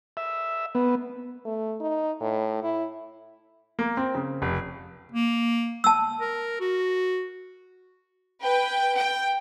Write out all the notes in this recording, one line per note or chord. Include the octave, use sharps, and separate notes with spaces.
E5
B3
A3
D#4
A2
E4
A#3
C4
C#3
F1
A#3
A5 E6
A#4
F#4
B4 G5
G5